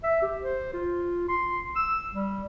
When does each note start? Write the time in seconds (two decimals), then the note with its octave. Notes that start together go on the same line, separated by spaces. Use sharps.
0.03 E5
0.22 G4
0.42 C5
0.73 F4
1.29 C6
1.76 E6
2.13 G3